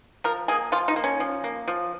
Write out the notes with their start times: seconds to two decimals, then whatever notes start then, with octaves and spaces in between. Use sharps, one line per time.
0.24 F3 A#4
0.48 A#3 G#4
0.72 F3 F4
0.88 D#4
0.96 A#3
1.04 C#4
1.20 F3
1.44 A#3
1.68 F3